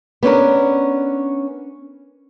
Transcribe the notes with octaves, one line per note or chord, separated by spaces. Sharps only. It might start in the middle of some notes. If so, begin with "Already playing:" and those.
B3 C#4 D4 A#4